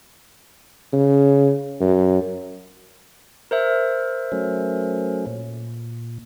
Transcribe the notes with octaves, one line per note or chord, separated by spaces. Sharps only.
C#3
F#2
A#4 C5 E5
F#3 A3 C#4
A#2